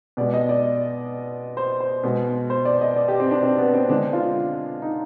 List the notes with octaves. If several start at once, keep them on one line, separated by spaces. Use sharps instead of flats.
B2 G#3 D5
D#5
D5
C5
C5
B2 G#3
C5
D5
D#5
D5
G4
C4
D4
C4
B3
C4
D3 G#3 D4
F4
D#4